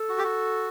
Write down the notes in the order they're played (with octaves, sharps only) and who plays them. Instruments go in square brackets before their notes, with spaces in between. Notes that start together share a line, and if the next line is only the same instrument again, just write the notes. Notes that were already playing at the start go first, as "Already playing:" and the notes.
Already playing: [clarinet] A4
[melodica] F#4
G4
F#4